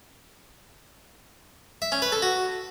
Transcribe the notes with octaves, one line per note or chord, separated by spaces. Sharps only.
E5
C#4
B4
A4
F#4